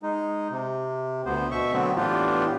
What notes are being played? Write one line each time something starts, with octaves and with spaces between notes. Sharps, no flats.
G#3 D#4
C3
D2 B3 C5
B2 E5 C#6
D3 F#3 A3 B3 C4
A2 E3 B3 D4 F4 G4